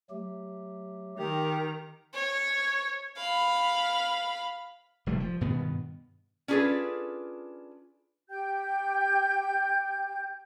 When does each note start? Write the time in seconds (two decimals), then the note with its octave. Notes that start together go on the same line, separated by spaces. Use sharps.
0.10 F#3 A3 G4
1.19 D#3 G4 A#4 A#5
2.14 C#5
3.17 F5 B5
5.06 F1 G3 A3
5.20 F3
5.41 G2 B2 D#3 B3
6.48 C#4 D4 F4 G#4 A4 B4
8.29 G4 G5 G6